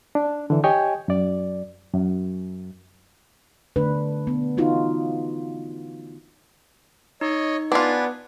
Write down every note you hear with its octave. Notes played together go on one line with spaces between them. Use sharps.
D4
D3 E3
G4 C#5 D#5 G5 G#5
F#2 D5
F#2
D3 A3 D4 B4
B3
E3 D#4 F4 F#4
D#4 C#5 D#5
B3 D4 F4 B4 D5 G#5